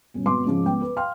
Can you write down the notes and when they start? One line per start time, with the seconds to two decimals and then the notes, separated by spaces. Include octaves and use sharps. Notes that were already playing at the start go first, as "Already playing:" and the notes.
0.14 G1 B2 C#4
0.26 G#1 B3 C6 D6
0.45 G#2 C#3 F3 G#3
0.65 C#2 B3 G5
0.81 B4
0.96 F5 G5 C6 F6